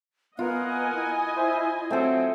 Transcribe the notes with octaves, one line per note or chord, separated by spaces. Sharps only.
B3 F4 A#4 D#5 F#5 G#5
E4
C5 E5
F#3 A3 C4 A4